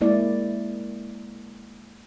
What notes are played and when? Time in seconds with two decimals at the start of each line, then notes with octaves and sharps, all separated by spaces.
0.01 G#3 A#3 E4 D5